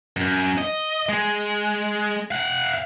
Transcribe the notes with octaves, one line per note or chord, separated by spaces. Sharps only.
F#2
D#5
G#3
F5 F#5